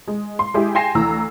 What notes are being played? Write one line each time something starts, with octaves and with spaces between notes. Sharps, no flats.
G#3
C6
G#3 E4 G4 G#4
G5 G#5 C6 A#6 C7 E7
D2 E3 A#5 E6